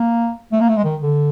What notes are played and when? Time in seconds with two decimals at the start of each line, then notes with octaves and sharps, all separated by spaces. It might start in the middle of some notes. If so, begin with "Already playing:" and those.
Already playing: A#3
0.52 A3
0.60 A#3
0.69 A3
0.77 G#3
0.85 D#3
1.01 D3